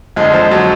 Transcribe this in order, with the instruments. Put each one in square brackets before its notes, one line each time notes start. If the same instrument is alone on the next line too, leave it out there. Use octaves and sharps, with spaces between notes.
[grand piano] F2 D3 G#3
F3
F#3